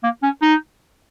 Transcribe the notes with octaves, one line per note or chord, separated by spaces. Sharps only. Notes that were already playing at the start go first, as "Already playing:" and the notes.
A#3
C#4
D#4